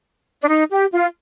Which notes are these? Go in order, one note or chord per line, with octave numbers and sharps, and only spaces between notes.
D4
D#4
G4
F4